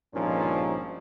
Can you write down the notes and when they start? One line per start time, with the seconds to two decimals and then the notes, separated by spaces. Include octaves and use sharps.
0.14 G#1 G2 A#2 F3 C#4 D#4